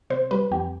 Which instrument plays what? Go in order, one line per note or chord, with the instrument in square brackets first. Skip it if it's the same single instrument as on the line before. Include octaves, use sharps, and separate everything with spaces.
[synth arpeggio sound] C3 C5
G3 B4
F2 G4